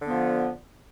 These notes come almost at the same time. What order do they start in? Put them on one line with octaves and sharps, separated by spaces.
D3 B3 F3